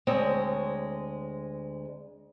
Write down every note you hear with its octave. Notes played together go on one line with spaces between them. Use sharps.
D2 G#3 C4 C#5